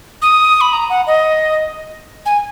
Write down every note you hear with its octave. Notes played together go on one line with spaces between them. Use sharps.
D#6
B5
A#5
F#5
D#5
G#5